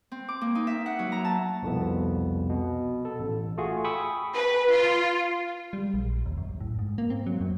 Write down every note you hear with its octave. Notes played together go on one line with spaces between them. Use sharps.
C4
D6
A#3
D#4
E5
F#5
F#3
A#5
A5
C2 F2 B2 B3
B2
A4
A1
A3 F4 F#4 G#4
G5 G#5 B5 C#6 D#6 E6
B4
F4
G3
A#1
D#2
F#2
A2
G#2
A#3
C4
F#3
F#2